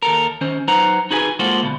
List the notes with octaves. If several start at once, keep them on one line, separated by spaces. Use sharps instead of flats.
D#2 A4 A#4
D#3 C#4 C5
F#3 D#4 B4 C5 F#5 A#5
D#4 F#4 G#4 B4 G#5
G#3 A#3 F4 F#4 A4 C5
D2 B2